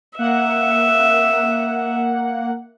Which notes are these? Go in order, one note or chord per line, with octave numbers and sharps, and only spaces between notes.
A#3 E5 F#5